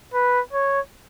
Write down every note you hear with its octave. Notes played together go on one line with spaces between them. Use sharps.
B4
C#5